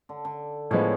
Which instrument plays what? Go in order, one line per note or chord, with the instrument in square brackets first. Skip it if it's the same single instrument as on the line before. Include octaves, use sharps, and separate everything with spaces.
[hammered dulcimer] D3
D3
[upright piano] A2 F3 G#3 B3 [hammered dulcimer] C#3